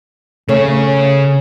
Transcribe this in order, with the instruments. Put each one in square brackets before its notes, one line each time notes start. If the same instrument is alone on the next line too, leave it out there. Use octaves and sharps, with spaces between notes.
[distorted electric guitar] C#3 G#4 [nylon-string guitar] A3 C#4 C#5